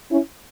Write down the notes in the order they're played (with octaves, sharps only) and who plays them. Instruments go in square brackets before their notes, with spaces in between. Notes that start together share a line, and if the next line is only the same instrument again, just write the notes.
[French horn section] C#4 E4